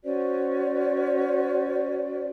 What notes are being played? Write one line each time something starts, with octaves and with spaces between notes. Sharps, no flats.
C#4 F#4 C5 D5